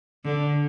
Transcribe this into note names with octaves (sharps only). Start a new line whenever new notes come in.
D3